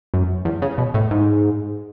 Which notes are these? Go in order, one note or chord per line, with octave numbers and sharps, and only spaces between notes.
F#2
E2
C#3
B2
A2
G#2